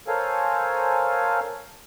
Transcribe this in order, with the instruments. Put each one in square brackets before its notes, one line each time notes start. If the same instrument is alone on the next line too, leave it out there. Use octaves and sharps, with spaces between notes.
[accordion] A4 A#4 C5 C#5 F5 G#5